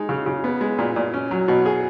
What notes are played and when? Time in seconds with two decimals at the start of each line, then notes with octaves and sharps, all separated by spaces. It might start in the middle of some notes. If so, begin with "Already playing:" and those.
Already playing: G#3 D#4
0.09 C#3
0.26 C#3
0.44 B3
0.61 G#3
0.79 A#2
0.96 A#2
1.14 C#4
1.31 F#3
1.48 B2
1.66 G#4